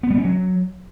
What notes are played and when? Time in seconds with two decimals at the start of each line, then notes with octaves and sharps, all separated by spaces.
0.03 B3
0.10 G3
0.18 C#4
0.25 F#3